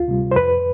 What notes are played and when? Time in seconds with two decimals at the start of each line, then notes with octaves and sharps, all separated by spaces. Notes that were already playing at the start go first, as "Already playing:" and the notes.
Already playing: D2 F4
0.08 C3 G3
0.31 C5
0.36 F2 B4